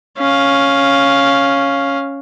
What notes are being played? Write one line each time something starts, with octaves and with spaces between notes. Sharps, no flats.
C#4 F5